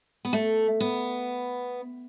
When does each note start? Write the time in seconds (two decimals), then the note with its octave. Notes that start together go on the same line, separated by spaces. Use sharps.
0.25 B3
0.33 A3
0.80 B3